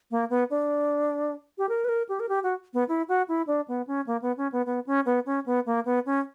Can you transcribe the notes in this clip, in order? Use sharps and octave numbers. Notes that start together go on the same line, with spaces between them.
A#3
B3
D4
G4
A#4
B4
A#4
G4
A#4
G4
F#4
B3
E4
F#4
E4
D4
B3
C#4
A#3
B3
C#4
B3
B3
C#4
B3
C#4
B3
A#3
B3
C#4